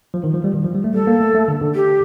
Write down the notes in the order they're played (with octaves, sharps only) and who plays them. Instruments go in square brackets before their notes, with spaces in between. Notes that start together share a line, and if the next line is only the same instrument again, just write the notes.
[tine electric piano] F3
D#3
F3
G3
D#3
F3
G3
A3
[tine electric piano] G3 [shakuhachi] A4
[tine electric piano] A#3
A3
A3
D3
D3
[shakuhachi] G4